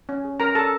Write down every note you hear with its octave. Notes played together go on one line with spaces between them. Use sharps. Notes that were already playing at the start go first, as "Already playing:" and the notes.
C#4
G#4
C#4 A#4 A#5
G#4 A4 A5